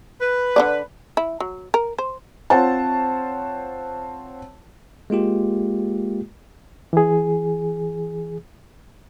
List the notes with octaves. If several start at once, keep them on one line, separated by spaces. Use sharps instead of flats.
B4
D3 C4 D5
E4
F#3
A#4
C5
C4 F4 C5 C#5 F#5 A5
G#3 A#3 F4 G4
E3 G#4